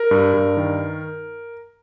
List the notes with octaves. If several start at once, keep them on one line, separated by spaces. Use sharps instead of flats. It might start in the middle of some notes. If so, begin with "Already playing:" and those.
Already playing: A#4
G2
G2
D#3